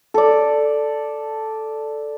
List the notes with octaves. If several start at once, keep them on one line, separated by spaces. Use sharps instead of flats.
A4 D5